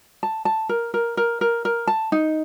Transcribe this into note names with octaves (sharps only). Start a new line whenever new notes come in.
A5
A5
A#4
A#4
A#4
A#4
A#4
A5
D#4